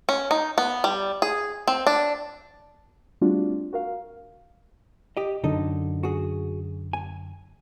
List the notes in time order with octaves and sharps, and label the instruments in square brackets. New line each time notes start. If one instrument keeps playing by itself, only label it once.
[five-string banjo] C#4
D#4
B3
G3
G#4
C4
D4
[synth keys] G3 A3 C4 D4 F4 F#4
F#4 A#4 F5
[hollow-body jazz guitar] G4 D#5
[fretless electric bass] F#2 D3 [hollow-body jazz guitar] D#4 A4 D#5
[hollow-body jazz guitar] F#4 G#4
G#5